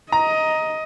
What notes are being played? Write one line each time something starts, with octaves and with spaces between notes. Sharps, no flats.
D#5 A#5